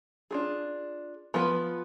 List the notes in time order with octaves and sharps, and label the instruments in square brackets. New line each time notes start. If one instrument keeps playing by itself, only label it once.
[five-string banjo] D4 F4 G#4
F3 B3 F4 B4